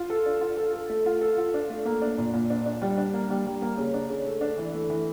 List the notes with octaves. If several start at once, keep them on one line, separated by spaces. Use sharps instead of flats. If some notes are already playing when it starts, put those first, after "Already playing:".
Already playing: F4
A4
D4
F4
A4
A4
A3
F4
A4
F4
D4
A3
A#3
D4
A#2
A#2
D4
D4
G3
D4
A#3
G3
G3
A#3
C#3
D4
C#3
A3
D4
E3
A3
E3